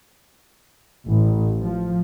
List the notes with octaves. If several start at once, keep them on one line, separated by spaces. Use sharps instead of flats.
A1
F3